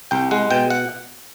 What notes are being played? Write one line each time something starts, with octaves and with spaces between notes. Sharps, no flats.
C2 G5
G#3 F#5
B2 G5
F#5